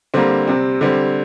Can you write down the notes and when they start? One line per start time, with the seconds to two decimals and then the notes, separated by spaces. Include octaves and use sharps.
0.14 D3 G3 A#3 C4
0.48 C3 G3 C4
0.81 D3 G3 C4